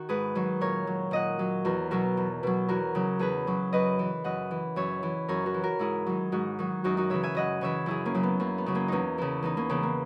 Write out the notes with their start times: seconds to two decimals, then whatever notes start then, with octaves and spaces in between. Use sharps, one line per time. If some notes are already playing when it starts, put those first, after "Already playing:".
Already playing: D#3 F#4
0.09 G#2 G#4 B4
0.35 D#3 F#3
0.61 A#2 A#4 C#5
0.87 F#3
1.11 A#2 D#5 F#5
1.39 F#3
1.65 E2 F#4 A#4
1.91 B2 F#3 F#4 A#4
2.17 E2
2.43 B2 F#3
2.68 E2 F#4 A#4
2.95 C#3 F#3
3.19 E2 G#4 B4
3.47 C#3 F#3
3.73 F#2 B4 D#5
3.99 E3
4.24 F#2 D#5 F#5
4.51 E3
4.76 F#2 C#5 E5
5.03 E3
5.28 F#2 A#4 C#5
5.46 F#4 A#4
5.54 E3
5.63 F#4 A#4
5.79 G#2 E4 G#4
6.06 D#3 F#3
6.32 G#2 D#4 F#4
6.59 D#3 F#3
6.84 F#2 D#4 F#4
6.97 D#4 F#4
7.10 C#3 E3 C#5 E5
7.23 E5 G#5
7.35 F#2 D#5 F#5
7.61 C#3 E3 C#5 E5
7.86 F#2 E4 G#4
8.06 A#3 C#4
8.14 C#3 F#3
8.23 B3
8.40 F#2 A#3
8.58 B3
8.66 C#3 F#3
8.75 A#3 C#4
8.88 E2 A#3 C#4 D#4
9.18 C#3 E3
9.43 E2 B3 D#4
9.57 A#3 C#4
9.69 C#3 E3 B3
9.83 A#3